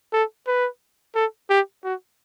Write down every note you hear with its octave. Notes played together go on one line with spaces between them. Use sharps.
A4
B4
A4
G4
F#4